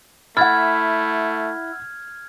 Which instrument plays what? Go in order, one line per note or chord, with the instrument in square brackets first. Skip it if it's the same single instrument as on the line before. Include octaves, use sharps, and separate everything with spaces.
[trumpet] A3 [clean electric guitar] E4 [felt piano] F#5 A6 [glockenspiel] F6 G#6